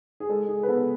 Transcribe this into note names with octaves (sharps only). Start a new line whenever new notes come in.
G#4
G#3 A4
G#4
B4
B3 A4